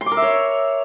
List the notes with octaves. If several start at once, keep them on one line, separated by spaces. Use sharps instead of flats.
C6
D6
A#4
E5
C#5